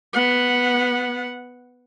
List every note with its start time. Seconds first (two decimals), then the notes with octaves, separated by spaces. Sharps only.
0.13 B3 F#5